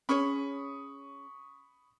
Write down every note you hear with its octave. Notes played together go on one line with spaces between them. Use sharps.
C#4 G#4 C#5 B5 C#6 D#6